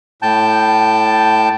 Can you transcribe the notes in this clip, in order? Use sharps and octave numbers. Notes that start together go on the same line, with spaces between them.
A2 G5 A5 G6